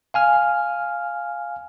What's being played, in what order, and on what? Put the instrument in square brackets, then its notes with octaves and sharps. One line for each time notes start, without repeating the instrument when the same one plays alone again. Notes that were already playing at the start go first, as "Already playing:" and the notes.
[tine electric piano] F5 G#5 F6